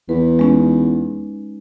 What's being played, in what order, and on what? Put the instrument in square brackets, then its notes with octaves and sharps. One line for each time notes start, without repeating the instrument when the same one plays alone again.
[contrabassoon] E2 [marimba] B4
[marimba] G#3 C#4 D#4